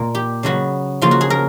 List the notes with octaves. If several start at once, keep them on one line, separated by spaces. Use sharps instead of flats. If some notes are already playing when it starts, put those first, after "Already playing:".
Already playing: A#2 A#3
G4
C#3 F#3 B3 F#4
C#3 F3 A#3 F4
F#4
G#4
A#4